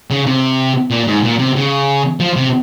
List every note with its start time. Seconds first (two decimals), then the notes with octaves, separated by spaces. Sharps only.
0.11 C#3
0.27 C3
0.91 A#2
1.07 G#2
1.23 A#2
1.39 C3
1.56 C#3
2.20 F3
2.36 C3